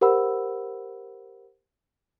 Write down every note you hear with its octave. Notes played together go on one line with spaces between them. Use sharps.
G4 A#4 C5 F#5 B5 E6